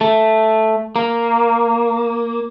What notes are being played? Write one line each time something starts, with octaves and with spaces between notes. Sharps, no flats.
A3
A#3